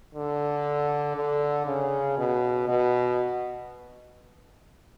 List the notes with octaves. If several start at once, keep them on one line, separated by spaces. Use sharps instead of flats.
D3
D3
C#3
B2
B2